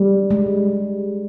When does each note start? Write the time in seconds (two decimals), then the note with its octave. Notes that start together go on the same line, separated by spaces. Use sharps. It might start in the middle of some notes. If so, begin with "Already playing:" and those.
Already playing: G3
0.31 G#3